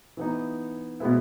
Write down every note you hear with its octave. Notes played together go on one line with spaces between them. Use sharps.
E3 B3 D#4
B2 G#3 B3 E4